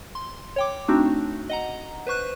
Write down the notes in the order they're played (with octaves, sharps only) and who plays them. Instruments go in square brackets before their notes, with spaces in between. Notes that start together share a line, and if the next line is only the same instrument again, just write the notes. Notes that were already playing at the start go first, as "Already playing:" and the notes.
[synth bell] C6
C#5 G5 D6
A3 C4 D4 D#4 F#4
D#5 F#5 A#5
B4 C5 C#6 F#6